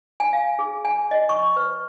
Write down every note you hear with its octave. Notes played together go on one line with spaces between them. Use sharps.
G#5
F5
G#4
G#5
D#5
C#6
B4